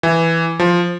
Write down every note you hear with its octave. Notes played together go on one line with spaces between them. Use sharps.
E3
F3